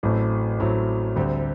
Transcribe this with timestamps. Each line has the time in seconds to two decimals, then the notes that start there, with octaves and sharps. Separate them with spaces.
0.03 A1 A2 F#3 A3 C4
0.60 A1 A2 F#3 A3 C4
1.16 D2 D3 G3 C4 G4